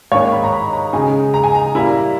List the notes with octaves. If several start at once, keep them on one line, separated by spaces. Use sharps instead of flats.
G#2 D#3 A#3 D#4 C#5
B5
A#5
B5
A#5
C#3 G#3 D#4 G#5
A#5
G#5
A#5
A#2 G3 A#3 E4